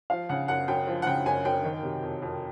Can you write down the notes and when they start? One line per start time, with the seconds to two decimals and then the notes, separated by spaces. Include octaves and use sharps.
0.10 F3 F5
0.29 C#3 F#5
0.48 F#2 F#5
0.68 F#2 G5
0.87 F3
1.02 F#5
1.07 C#3 G5
1.26 F#2 G#5
1.45 F#2 G5
1.64 D#3
1.83 C3
2.02 F2
2.22 F2